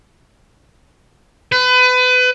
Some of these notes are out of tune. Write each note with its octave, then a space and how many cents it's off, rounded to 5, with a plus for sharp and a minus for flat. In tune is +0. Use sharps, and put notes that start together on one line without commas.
B4 +30